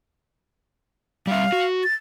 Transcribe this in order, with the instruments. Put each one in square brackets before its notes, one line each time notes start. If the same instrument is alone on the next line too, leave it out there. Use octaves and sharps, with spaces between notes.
[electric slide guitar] G3 E5 [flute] F5
[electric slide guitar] F#4
[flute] A6